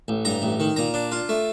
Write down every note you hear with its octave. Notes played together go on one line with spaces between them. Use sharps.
A1
G2 A#5
A1
D#3
A#2 A#5
D4
F4
A3